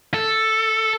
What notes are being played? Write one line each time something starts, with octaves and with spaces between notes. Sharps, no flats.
A4